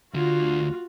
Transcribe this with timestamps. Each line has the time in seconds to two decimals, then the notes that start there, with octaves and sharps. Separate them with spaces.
0.14 D2 D3 F4 F#4